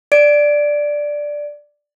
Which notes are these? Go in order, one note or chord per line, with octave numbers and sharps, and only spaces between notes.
D5 D7